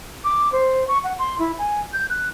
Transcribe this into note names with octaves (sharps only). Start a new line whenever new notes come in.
D6
C5
C#6
F#5
C6
E4
G#5
G6
F#6